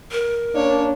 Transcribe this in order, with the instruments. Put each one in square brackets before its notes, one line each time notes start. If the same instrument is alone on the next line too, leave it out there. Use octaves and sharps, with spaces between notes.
[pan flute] A#4
[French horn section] A#3 C#4 D4 [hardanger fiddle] C#5